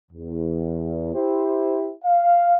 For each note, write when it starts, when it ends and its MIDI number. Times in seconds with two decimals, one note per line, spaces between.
0.12 1.11 40
1.15 1.91 64
1.15 1.91 67
1.15 1.91 72
2.04 2.57 77